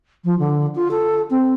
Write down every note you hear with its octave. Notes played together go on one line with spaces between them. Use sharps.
F3
D3
F4
A4
C4